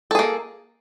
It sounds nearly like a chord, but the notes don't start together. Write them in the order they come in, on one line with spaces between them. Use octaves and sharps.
A4 G#4 A#3